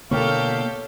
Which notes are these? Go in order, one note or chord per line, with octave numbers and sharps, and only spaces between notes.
B2 D3 A#3 G4 A4 A#4 C#5 F5